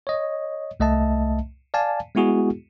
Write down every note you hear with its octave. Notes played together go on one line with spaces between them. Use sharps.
C#5 D#5
C2 A3 D#5 E5 A5
D5 F5 G#5 A5
G#3 B3 E4 F#4 G#4